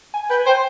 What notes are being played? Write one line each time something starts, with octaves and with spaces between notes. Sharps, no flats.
G#5
B4 G5
G#5
C5 G5